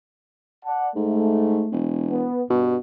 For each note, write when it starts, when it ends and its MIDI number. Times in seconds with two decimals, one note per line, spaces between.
0.65 0.89 74
0.65 0.89 78
0.65 0.89 81
0.96 1.65 44
0.96 1.75 57
1.72 2.26 28
2.09 2.42 59
2.50 2.77 43
2.50 2.77 47